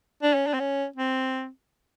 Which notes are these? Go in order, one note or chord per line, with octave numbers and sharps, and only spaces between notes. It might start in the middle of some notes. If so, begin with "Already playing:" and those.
D4
C#4
D4
C4
C#4
C4